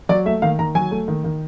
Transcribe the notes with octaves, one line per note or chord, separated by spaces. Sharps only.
F#3 D5
A3 E5
D#3 F5
D#3 A#5
F#3 G#5
A3
D#3
D#3